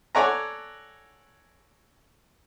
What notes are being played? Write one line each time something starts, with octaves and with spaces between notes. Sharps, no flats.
A4 C#5 D5 F#5 G#5 A#5